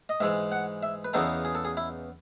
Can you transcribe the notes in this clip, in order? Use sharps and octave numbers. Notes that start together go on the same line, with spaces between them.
D#5
G#2 E3 G#3 E5
F#5
E5
B4
E2 C#3 E3 B3 D#4 A4
G#4
A4
G#4
E4